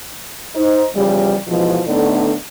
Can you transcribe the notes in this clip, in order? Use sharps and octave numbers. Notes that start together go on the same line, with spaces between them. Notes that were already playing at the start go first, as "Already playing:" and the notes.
D#4 C5
E2 C#3 F3 G3
G#2 B2 E3 F3
A2 D3 A3 B3 D4 D#4